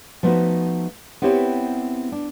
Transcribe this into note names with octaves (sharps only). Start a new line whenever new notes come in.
F3 A3 B3 C4 D#4 F#4
B3 C4 E4 G4 C#5
D4